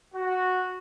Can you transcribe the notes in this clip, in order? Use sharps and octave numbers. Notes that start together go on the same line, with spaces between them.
F#4